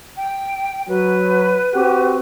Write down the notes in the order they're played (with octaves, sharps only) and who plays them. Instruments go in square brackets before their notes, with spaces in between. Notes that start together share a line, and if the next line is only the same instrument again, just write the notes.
[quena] G5
[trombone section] F#3 [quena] B4
[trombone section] C4 F#4 G4